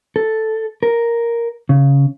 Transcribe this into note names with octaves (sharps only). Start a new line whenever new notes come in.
A4
A#4
C#3